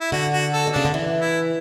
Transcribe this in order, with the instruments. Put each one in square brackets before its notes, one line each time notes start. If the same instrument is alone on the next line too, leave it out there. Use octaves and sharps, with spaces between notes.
[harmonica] E4
[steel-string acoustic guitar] D3 [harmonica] F#4
[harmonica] F#4
A4
[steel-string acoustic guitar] B2
[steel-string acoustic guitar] C#3 [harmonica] D4
[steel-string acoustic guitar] D3
E3
[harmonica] E4